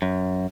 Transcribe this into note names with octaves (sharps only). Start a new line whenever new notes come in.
F#2